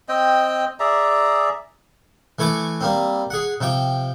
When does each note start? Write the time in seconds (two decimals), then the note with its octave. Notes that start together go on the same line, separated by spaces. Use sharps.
0.09 C4 D#5 G5
0.80 G#4 D5 E5 A#5
2.39 E3 A3 G#5 C#6 D6
2.81 G3 A#3 C4
3.31 G#4 F#5
3.61 C3 F3 G5